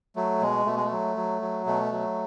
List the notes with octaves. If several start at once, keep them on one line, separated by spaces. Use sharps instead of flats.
F#3 A3
B2 G#3
B2 A3
G#3
A3
F#3
F#3
F#3
B2 A3
F#3